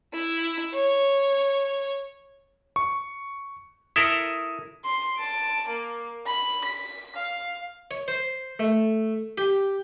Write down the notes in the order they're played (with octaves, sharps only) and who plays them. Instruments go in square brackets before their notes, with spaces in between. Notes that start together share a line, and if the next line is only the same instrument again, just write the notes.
[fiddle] E4
C#5
[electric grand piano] C#6
[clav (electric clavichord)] E4 A4 A#4 [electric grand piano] D#6
[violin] C6
A5 D7
A#3
B5
B6
F5
[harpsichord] C#5
C5
A3
G4